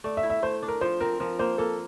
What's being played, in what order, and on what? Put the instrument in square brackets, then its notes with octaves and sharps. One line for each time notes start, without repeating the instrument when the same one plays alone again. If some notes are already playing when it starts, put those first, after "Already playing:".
[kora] A3 [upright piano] D5
[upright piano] E5
[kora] E4
[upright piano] E5
[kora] A3 [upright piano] C5
[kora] D4
[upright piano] A#4
[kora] F3 [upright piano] C5
[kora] C4 [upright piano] A#4
[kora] F3 [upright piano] A#4
[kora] A#3 [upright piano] C5
[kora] A#3 [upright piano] A4